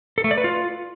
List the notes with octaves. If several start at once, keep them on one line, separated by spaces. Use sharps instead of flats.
A4
A3
D5
B4
F4